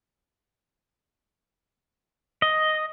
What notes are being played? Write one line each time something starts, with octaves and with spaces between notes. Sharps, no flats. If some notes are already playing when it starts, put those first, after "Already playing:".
D#5